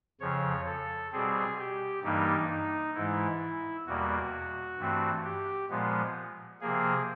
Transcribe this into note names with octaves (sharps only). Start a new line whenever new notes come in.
F2 C#3 F3 C#5
A4
B2 G3 C4 G#4
G4
G2 E3 G3 A#3 D#4
D#4
G#2 E3 G#3 E4
E2 B2 G3 A#3 F#4
G2 E3 A3 C4
G4
A#2 F3 G#3 B3
C3 F3 A#3 G#4